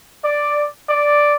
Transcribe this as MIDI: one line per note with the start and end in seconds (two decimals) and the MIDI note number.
0.24 0.66 74
0.89 1.36 74